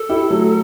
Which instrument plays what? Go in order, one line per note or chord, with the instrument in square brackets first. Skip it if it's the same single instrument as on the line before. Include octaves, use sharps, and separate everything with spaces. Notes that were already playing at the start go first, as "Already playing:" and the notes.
Already playing: [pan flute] A4
[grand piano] E4 G4
F#3 A3